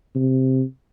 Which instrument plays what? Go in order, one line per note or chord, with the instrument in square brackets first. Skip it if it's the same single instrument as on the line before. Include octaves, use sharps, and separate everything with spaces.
[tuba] C3